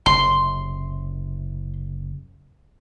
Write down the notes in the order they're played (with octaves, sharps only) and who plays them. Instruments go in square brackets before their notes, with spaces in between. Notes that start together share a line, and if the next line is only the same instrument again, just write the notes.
[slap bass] F#1 C3 [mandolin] C6